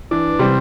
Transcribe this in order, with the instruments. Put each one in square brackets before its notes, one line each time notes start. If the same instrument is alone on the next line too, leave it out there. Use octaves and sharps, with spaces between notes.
[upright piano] E3 [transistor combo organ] D4
[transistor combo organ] C3 [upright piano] G3